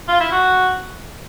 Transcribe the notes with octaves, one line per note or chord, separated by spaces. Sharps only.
F4
E4
F#4